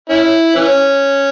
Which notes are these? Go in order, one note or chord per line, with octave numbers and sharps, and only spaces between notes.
C#4 E4
E3 C#4